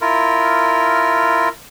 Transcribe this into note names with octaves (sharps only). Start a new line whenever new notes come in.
E4 F4 A#4